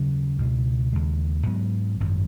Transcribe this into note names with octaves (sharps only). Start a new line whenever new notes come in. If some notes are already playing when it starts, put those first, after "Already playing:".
Already playing: D#2 C#3 F#3 C#4
C#2 B2 G#3
D#2 C#3 G#3
G#2 F#3 B3
G#1 F#2 F#3